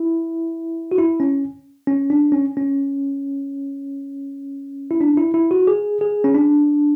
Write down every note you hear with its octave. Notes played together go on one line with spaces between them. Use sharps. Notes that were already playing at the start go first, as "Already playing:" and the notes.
Already playing: E4
F#4
E4
C#4
C#4
D4
C#4
C#4
E4
D4
E4
E4
F#4
G#4
G#4
C#4
D4